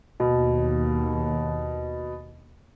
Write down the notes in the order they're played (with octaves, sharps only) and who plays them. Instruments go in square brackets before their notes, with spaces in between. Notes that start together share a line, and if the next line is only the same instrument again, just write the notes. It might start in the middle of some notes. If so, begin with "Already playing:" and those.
[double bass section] D#2 [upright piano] B2